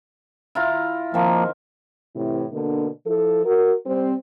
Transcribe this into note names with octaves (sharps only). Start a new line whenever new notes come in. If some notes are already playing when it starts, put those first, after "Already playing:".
E4 F4 A#5
D#3 F3 A#3 C4
A2 C3 E3
B2 D3 A#3 D4
F3 E4 A4
F#4 A#4
G3 C4